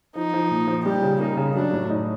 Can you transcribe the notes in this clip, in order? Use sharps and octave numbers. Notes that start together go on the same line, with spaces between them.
F3 D#4
F3
A#2
F3
G3 G4
C#3
A#3 D#4
C#3
F#3 D4
A2
D#4